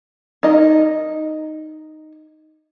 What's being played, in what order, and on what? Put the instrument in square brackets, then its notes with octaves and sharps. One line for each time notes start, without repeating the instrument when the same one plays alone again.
[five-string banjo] D#4 A#4 D#5